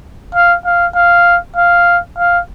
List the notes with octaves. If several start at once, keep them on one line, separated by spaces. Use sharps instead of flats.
F5
F5
F5
F5
F5